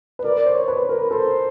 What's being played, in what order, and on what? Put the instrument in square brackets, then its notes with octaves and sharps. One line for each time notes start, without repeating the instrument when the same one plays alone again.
[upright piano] B4
[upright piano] A#4 [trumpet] D5
[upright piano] C5
[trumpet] C#5
[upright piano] B4
[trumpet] B4
[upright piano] A#4
[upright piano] A4 [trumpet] C5